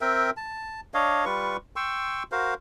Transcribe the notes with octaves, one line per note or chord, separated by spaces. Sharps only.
C4 A#4 E5 G5
A5
D4 C#5 D#5 F5
G3 F4 B4 C#6
G5 C6 C#6 E6
F#4 A#4 C5 F5